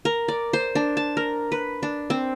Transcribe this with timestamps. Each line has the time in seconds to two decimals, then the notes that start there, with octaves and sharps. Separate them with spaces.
0.05 A#4
0.28 D5
0.53 C5
0.75 D4
0.97 A5
1.17 A#4
1.52 B4
1.83 D4
2.10 C4